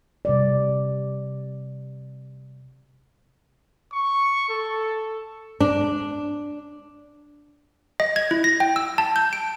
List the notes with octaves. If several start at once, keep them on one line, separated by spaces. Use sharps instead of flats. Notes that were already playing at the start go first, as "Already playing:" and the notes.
C3 G3 D5
C#6
A4
D4
D#5
G#6
E4
A#6
G5
E6
A5
G6
D7